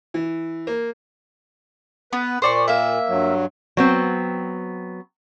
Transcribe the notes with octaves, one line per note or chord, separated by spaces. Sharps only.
E3
A#3
B3 B4
A#2 C5 D5 C#6
A#3 E5
G2 F#3
F#3 B3 C4